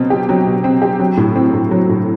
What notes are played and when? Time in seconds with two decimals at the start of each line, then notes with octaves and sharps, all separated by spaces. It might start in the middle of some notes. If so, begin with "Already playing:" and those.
Already playing: B2 F#3 C4
0.10 G4
0.29 F#3
0.47 B2
0.64 C4
0.82 G4
1.00 F#3
1.17 A2
1.36 C4
1.53 A2
1.71 F#3
1.89 A2